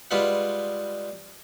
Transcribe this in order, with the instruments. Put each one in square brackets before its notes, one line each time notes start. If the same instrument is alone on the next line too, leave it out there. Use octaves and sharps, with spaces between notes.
[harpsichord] G3 G#3 F4 B4 E5 F#5